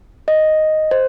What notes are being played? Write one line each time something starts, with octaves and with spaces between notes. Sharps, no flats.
D#5
C5